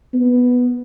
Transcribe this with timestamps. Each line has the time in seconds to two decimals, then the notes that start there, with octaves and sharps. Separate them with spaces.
0.14 B3